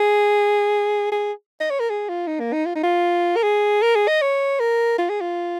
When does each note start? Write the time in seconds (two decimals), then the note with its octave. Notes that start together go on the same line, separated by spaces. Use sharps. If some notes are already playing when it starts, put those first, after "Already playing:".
Already playing: G#4
1.12 G#4
1.61 D#5
1.70 C#5
1.80 A#4
1.90 G#4
2.09 F4
2.27 D#4
2.40 A#3
2.53 D#4
2.66 F4
2.75 D#4
2.83 F4
3.36 A#4
3.43 G#4
3.82 A#4
3.95 G#4
4.08 D#5
4.22 C#5
4.60 A#4
4.98 F4
5.10 G#4
5.21 F4